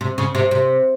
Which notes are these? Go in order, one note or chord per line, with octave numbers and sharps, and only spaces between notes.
C3
C#3
C3
C3